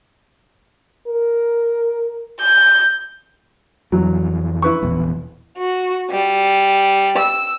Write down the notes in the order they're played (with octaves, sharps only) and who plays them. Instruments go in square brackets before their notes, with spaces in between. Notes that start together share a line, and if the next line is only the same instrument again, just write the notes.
[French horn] A#4
[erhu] G6
[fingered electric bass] F2 E3 [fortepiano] F#3
[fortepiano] E4 B4 C#6
[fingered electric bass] E1 A#1 E2
[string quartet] F#4
G3
E6